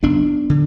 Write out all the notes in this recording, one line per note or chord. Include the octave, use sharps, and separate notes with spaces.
F#1 B3 D4
D3